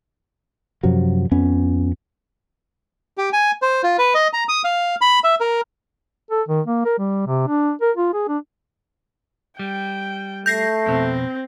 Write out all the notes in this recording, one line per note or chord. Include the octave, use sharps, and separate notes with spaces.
F#2 C3 F3 F#3
F2 B3 C#4
G4
G#5
C5
F4
B4
D#5
A#5
D#6
F5
B5
E5
A#4
A4
D#3
A#3
A#4
G3
C3
D4
A#4
F4
G#4
D4
G3 G5
A3 G6 A#6 C7
F2 B2 C4